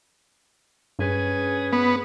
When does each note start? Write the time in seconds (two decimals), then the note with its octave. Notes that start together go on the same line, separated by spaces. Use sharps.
0.99 G2 C#4 G#4 B4
1.73 B3